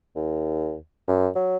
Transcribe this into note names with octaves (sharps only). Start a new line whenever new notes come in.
D#2
F#2
F#3